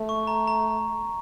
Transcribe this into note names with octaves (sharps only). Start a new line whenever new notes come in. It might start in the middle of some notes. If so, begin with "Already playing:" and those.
Already playing: A3
C#6
A#5
A#5